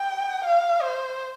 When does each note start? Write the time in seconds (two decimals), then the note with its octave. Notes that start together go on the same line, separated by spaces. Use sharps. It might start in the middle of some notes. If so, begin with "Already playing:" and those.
Already playing: G5
0.44 F5
0.82 C5